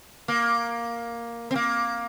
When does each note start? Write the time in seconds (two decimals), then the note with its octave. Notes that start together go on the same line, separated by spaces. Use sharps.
0.28 A#3
1.51 C4
1.56 A#3